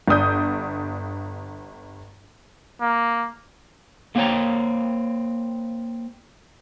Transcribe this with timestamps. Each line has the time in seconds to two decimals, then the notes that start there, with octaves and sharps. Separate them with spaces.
0.08 G1 D5 D#6 G6
2.81 A#3
4.15 A3 A#3 C4 C#5 G5 A#5